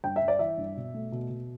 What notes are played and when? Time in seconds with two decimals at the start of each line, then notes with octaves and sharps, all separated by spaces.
0.04 G2 G5
0.16 E5
0.21 G2
0.28 D5
0.39 E3 E5
0.58 G2
0.76 B2
0.94 A3
1.12 B2
1.30 B2